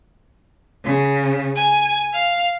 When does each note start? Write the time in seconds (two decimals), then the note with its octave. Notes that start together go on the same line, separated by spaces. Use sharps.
0.85 C#3
1.56 G#5
2.14 F5